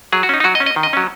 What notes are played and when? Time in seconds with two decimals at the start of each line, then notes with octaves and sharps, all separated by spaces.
0.12 F#3 G#4
0.23 F#4
0.29 C#4 D#4
0.40 D#4
0.44 F#3 F#4
0.55 D#5
0.60 C#4
0.66 D#5
0.76 D#3
0.83 D#5
0.93 F#3 C#4